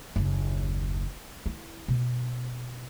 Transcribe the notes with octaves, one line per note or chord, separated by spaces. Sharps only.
F#1 D#2
E4
B2